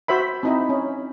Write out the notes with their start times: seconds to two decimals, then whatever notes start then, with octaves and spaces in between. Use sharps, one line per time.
0.08 F#4 C5 E5 B5
0.43 C4 D#4 E4
0.69 C#4